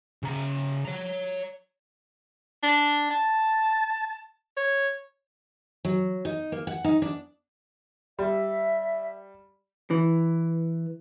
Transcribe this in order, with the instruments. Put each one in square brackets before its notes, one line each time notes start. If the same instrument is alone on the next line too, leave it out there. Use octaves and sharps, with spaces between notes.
[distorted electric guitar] C#3 A#5
C#5 A#5
[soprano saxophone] D4
A5
C#5
[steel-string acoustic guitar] F#3
D#4
A#3
F#5
D#4
D4
[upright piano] G3 [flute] E5
[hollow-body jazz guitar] E3